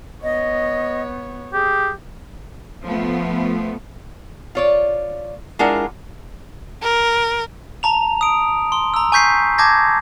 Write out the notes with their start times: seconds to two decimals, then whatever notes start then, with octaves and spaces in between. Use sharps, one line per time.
0.23 B3 C#5 D#5
1.53 G4 G#4
2.84 F3 A3 B3
4.55 F4 C#5 D5
5.59 G#3 D4 E4 F4 A#4 F#5
6.83 A#4
7.83 A5 A#5 F7
8.21 D#6 D7
8.72 C6
8.94 A#5 E6
9.12 G#5 C#6 G6 B6 C7
9.58 A5 D6 G6 G#6 A#6